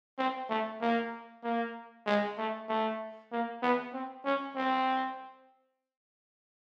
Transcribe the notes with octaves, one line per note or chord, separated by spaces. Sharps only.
C4
A3
A#3
A#3
G#3
A3
A3
A#3
B3
C4
C#4
C4